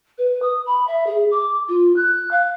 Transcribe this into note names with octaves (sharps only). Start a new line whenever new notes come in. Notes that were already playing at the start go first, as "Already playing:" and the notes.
B4
D#6
B5
E5
G#4
D6
F4
F#6
F5